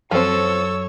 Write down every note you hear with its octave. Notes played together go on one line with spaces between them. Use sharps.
F#2 F3 C4 A4 C#5 F5 E6